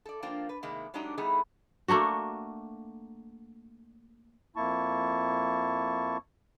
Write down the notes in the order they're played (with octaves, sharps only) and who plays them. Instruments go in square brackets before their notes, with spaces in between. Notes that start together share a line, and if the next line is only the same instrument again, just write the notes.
[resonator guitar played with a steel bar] A4 D5
F3 A#3 C4 D4 F4
B4
A2 C3 D#3 G#3 A#3
F#3 G#3 A3 D4 D#4 G4
G3 A3 B3 D#4 E4 G#4
[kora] A3 A#3 D4 F#4
[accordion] F2 A#3 E4 A5 C#6